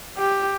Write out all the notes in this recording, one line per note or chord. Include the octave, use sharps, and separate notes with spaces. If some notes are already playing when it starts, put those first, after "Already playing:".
G4